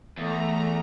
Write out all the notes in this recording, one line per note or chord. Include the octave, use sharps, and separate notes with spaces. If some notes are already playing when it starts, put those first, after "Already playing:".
E2 A3 A#5